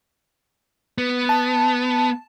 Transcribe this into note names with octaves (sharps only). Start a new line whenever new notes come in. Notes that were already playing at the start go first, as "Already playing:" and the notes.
B3
A5